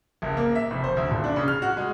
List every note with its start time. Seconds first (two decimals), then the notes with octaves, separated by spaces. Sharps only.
0.22 F#1
0.37 A#3
0.55 E5
0.71 F1
0.84 C5
0.97 D2
1.11 D#1
1.24 D4
1.36 C#3
1.48 F6
1.62 F#4
1.77 G#3